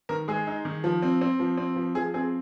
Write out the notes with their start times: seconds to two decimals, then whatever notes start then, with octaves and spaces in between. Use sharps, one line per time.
0.09 D#3 A#4
0.28 G#3 G#4
0.47 D#4
0.65 D#3
0.84 F3
1.02 C4
1.21 C4
1.40 F3
1.57 C4
1.76 F3
1.95 F3 G#4
2.14 C4 G#4